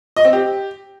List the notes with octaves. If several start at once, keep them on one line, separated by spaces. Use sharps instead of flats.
D#5
C4
G4